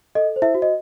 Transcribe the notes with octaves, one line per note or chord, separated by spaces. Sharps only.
A4 D#5
C5
E4 E5
F#4
D#5